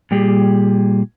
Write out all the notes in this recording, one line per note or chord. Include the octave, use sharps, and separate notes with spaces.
A#2 G3 G4 G#4